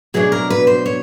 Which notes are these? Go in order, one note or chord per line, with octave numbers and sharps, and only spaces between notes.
B2 F#3 A3 D4 G#4
A#4
B4
C5
C#5